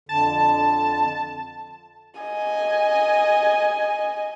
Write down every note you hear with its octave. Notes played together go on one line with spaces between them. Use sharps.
F2 D3 A5
D#5 G#5